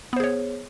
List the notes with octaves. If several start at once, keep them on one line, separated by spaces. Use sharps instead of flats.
B3 G#4 C5 C#5